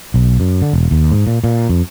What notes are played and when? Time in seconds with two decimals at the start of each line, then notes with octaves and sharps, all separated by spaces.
0.14 B1
0.40 F#2
0.62 D3
0.73 E1
0.91 D#2
1.12 G#2
1.27 A#2
1.44 A#2
1.69 F2